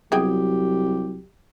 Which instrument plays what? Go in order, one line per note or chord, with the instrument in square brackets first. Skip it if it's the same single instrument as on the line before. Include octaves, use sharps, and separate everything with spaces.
[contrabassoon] C2 [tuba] F#3 [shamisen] B3 G#4 G5 [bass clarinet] G4